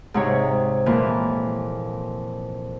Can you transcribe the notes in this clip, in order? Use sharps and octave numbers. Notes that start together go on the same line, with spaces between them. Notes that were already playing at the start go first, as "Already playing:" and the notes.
G#2 C3 C#5
F2 A#2 E3